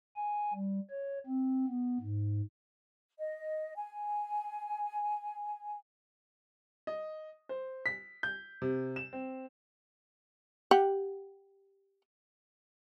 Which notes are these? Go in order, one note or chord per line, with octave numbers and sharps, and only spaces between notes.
G#5
G3
C#5
C4
B3
G#2
D#5
G#5
D#5
C5
B6
G6
C3
E7
C4
G4 F#5